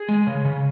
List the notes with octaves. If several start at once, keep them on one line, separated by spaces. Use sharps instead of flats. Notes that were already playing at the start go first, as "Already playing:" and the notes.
Already playing: G#4
G#3
C#3
C#3